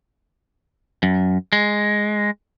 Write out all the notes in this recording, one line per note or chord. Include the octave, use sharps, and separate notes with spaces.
F#2
G#3